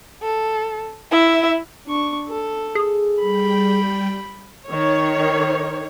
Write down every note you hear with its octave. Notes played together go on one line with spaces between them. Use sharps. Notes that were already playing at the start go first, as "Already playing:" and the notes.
A4
E4 E5
D4 C#6
A4
G#4
G3 G5 B5
D#3 C#5